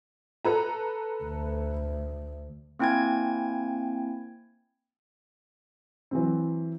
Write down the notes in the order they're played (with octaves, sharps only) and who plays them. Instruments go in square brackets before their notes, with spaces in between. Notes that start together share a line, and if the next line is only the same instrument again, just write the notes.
[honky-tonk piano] A4 B4 A#5
[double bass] D2
[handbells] A#3 C4 E4 G5 G#5 G#6
[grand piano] E3 F#3 C4